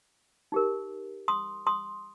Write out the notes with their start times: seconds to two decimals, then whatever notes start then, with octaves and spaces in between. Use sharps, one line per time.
0.52 D#4 G4 A#4
1.28 C6 D#6
1.67 C6 D#6